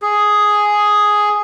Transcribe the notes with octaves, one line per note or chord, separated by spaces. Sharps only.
G#4